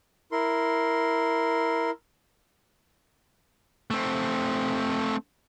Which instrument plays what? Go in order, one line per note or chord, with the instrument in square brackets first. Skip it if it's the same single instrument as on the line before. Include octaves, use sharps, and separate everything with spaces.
[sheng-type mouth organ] E4 A#4 C6
[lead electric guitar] A3 C4